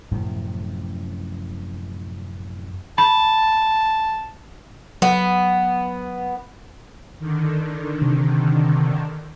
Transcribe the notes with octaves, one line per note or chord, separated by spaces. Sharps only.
F#2 A2 C3 F3
A5 B5
F#3 B3
D3 D#3
C3